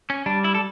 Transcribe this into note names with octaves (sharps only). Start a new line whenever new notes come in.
C#4
G3 D4
E4
A4